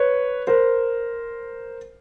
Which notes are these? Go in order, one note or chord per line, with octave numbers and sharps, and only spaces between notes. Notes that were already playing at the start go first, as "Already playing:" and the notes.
Already playing: B4 C#5
A#4 C5